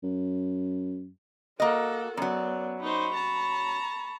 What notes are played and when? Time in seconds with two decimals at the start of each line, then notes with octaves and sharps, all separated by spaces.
0.03 F#2
1.60 A#3 F#4 A4 A#4 D#5
2.17 F#2 F#3 B3 D5
2.81 D#4 C5 B5 C#6
3.14 A5 A#5